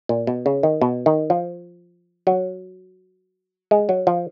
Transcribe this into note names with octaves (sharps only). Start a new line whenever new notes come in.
A#2
B2
C#3
D#3
B2
D#3
F3
F#3
G#3
F#3
F3